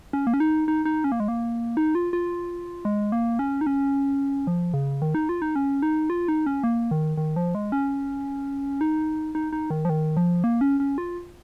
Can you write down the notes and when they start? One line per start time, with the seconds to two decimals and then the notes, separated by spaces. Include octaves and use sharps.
0.13 C#4
0.27 A#3
0.34 C#4
0.40 D#4
0.68 D#4
0.85 D#4
1.04 C#4
1.12 A#3
1.20 G#3
1.28 A#3
1.77 D#4
1.95 F4
2.13 F4
2.85 G#3
3.12 A#3
3.39 C#4
3.61 D#4
3.67 C#4
4.47 F3
4.74 C#3
5.02 D#3
5.15 D#4
5.29 F4
5.42 D#4
5.56 C#4
5.82 D#4
6.10 F4
6.28 D#4
6.46 C#4
6.64 A#3
6.91 D#3
7.17 D#3
7.36 F3
7.55 G#3
7.72 C#4
8.81 D#4
9.35 D#4
9.53 D#4
9.70 D#3
9.85 F3
9.89 D#3
10.17 F3
10.44 A#3
10.61 C#4
10.80 C#4
10.98 F4